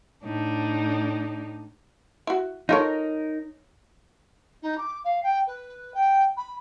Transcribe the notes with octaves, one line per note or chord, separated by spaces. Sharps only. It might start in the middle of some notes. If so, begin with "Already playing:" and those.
A2 D4 D#4
E4 F#4
D#4 F4 A4 A#4 C#5
D#4
D6
F5
G5
B4
G5
B5